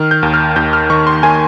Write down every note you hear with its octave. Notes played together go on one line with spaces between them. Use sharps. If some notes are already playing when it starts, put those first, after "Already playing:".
Already playing: D#3 F6
G6
D#2
F6
D#2 G6
F6
D#3 C#6
C6
D#3 G#5